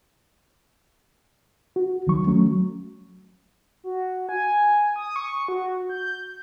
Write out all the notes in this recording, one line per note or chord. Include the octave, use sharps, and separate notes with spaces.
F#4
C#2 D#3 F#3 C#6
F#3 A3 C#4
F#4
G#5
D#6
C#6
F#4
G6